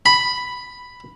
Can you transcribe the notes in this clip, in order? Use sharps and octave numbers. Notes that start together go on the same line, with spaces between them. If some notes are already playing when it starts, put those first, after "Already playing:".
B5